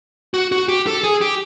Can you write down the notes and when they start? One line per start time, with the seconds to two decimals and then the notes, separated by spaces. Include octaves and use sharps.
0.34 F#4
0.52 F#4
0.68 G4
0.87 A4
1.04 G#4
1.21 G4